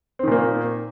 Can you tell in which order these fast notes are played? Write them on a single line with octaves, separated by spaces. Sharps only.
C4 D#3 A#2 A#3